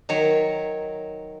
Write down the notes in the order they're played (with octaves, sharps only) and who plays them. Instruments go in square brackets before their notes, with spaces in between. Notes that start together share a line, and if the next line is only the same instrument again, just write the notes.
[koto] D#3 F#3 C#5